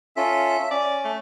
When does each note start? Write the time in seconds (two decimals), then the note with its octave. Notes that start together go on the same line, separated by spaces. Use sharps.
0.17 C#4 F4 A4 E5
0.71 C#4 D5
1.05 A3